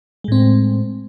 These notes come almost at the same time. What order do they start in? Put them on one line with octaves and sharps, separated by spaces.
G#3 A2 C4